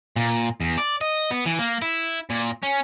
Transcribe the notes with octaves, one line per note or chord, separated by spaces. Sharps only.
A#2
E2
D5
D#5
B3
E3
A#3
E4
A#2
C#4